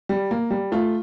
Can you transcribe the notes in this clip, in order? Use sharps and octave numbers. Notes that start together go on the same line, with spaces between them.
G3
A#3
G3
A3 F4